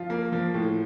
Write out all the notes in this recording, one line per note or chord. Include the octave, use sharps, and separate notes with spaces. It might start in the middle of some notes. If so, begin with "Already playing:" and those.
Already playing: F3 F4
A#3
F3
A2